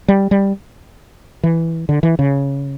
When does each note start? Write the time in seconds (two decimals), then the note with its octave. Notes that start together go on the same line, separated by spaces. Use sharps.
0.08 G3
0.31 G3
1.43 E3
1.89 D3
2.03 E3
2.19 C#3